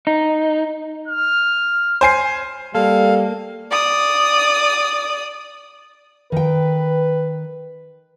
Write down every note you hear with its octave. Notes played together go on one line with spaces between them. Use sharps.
D#4
F6
C5 G#5 C7
G3 A#3 A4 F5
D5 D#6
D#3 B4 G5